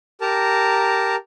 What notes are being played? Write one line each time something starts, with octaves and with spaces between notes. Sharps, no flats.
G4 A#4 A5 A#5